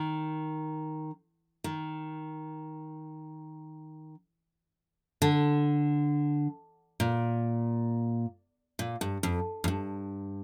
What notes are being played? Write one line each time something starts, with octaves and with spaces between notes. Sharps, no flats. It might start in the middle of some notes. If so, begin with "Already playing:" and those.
Already playing: D#3
D#3
D3
A#2
A#2
G2
F2
F2
G2